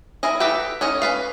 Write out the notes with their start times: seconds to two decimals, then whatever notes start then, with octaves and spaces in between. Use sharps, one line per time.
0.23 E4 G#4 A#4 D#5
0.40 G4 A4 B4 E5 G5
0.81 C#4 C#5 D#5
1.02 C#4 B4 F5